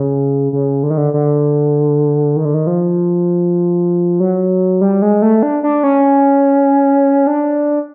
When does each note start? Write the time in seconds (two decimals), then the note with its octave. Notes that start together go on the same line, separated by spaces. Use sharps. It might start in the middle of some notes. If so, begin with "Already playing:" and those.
Already playing: C#3
0.53 C#3
0.83 D3
0.90 D#3
0.98 D3
1.14 D3
2.36 D#3
2.45 D3
2.54 D#3
2.67 F3
4.20 F#3
4.81 G3
5.02 G#3
5.22 A3
5.43 D4
5.63 D4
5.83 C#4
7.27 D4